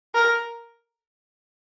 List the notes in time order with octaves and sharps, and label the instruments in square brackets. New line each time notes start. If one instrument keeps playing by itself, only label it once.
[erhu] A#4